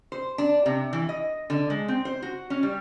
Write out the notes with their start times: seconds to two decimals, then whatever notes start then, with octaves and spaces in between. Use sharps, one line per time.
0.12 C5
0.38 D4
0.66 C3
0.93 E3
1.09 D#5
1.50 D3
1.70 G#3
1.88 C4
2.05 C5
2.22 F#4
2.50 C#4
2.63 G3